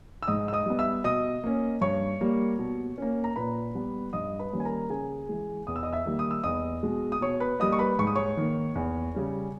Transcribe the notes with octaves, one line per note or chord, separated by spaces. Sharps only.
E6
G#2 D#5 D#6
E6
D#5 D#6
G3 B3
E5 E6
B2 D#5 D#6
A#3 C#4
G2 C#5 C#6
G3 A#3
B2
A#3 C#4
A#5
A#2 B4 B5
G3 B3
G2 D#5 D#6
B4 B5
D#3 G3 A#3 C#4
G#5
A#4 A#5
C#3 G#4 G#5
E3 G#3
E2 D#6
E6
D#5 D#6
E5 E6
D#3 G3 A#3
D#6
E6
E2 D#5 D#6
B2 G#3
D#6
B2 C#5 C#6
B4 B5
G3 A#3 D#5 D#6
C#6
B4 B5
G#2 C#6
D#6
C#5 C#6
D#3 A#3
E2
C#3 G3 C#4